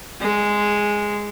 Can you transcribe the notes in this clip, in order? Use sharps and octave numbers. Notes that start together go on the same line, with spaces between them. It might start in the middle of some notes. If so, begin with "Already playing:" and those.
G#3